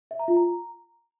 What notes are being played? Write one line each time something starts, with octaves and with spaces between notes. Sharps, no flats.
E5
A#5
F4
A#5